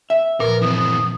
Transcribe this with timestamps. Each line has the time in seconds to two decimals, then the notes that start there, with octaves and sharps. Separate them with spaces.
0.10 E5
0.40 A#2 F3 A#4 B4
0.62 E3 C4 D#6